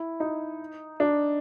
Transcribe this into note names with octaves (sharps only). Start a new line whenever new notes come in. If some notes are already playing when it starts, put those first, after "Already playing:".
Already playing: E4
D#4
D4